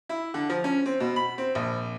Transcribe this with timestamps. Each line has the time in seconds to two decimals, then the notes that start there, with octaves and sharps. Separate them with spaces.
0.09 E4
0.34 D3
0.50 F3
0.64 C#4
0.86 C4
1.00 B2
1.16 B5
1.38 C4
1.55 A#1